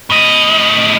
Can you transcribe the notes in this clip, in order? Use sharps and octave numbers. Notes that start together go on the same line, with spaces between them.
A2 D#5